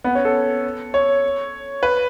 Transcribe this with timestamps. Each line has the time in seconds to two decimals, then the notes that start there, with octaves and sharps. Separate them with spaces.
0.04 B3
0.15 C#4
0.25 A4
0.94 C#5
1.83 B4